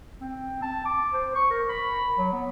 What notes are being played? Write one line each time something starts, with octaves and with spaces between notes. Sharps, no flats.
C4
A5
D6
C5
C#6
A#4
B5
F#3
B3